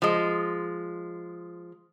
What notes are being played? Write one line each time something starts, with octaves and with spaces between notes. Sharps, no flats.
F3 G#3